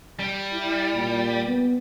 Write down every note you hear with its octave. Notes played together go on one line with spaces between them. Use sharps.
G3
E4
A#2
B3